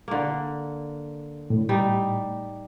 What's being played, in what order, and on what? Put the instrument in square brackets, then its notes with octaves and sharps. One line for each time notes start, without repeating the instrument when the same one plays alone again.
[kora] D3 A#3
[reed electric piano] A2
[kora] G3 D#4